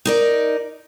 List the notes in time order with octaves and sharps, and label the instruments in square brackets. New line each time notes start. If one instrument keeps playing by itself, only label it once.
[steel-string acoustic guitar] D#4 A#4 D5